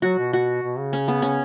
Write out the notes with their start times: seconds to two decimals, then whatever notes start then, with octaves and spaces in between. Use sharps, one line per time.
0.02 F#3 F#4
0.18 B2
0.33 F#4
0.63 B2
0.78 C#3
0.93 C#4
1.08 B3
1.22 C#4